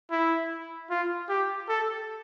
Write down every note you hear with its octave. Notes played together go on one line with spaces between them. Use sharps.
E4
F4
G4
A4